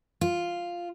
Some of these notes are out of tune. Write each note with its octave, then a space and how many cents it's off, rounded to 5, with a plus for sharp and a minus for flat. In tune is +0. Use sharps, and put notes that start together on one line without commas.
F4 +0